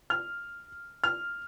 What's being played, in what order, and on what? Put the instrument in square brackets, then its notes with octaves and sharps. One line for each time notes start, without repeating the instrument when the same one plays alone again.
[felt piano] F6
F6